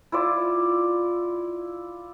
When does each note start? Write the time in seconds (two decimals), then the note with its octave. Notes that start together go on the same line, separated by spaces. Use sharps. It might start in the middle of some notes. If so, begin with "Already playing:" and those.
0.12 E4 F4 D5